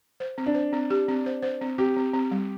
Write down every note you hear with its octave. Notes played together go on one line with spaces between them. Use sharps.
C5
C4
D4
C5
C4
G4
C4
C5
C5
C4
C4 G4
C4
C4
G3